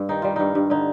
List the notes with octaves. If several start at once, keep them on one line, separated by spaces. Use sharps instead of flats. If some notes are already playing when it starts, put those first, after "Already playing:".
Already playing: G2
D#3 D#4
G3 F4
G2 D#4
G2
D3 D#4